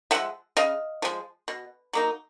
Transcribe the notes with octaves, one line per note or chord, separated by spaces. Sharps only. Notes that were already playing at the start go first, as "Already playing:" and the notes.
F3 G#3 E5 F#5
C#3 D#5 F5
F3 G#3
B2
F#3 A#3 D#4